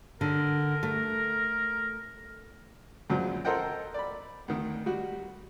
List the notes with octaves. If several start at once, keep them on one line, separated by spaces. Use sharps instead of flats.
D3 A#4
A3
F#2 A#2 C#3 F3 F#3
A4 A#4 C5 D#5 F#5 G5
D5 B5
D2 D#3
G3 F#4